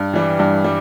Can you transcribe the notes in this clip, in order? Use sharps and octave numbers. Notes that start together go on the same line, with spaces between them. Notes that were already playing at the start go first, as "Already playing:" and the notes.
Already playing: G2
E3 G3
G2
G3